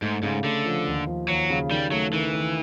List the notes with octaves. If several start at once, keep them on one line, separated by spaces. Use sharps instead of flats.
G#2 A3
G#2 C#3
D3 A3
F3
D#2
F3
D#2 F#3
C#3
D#3 G3
F#3 A3
D#3 E3
D#3